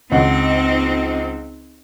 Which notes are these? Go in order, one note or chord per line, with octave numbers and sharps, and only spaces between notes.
C#2 C4 D#4 F#5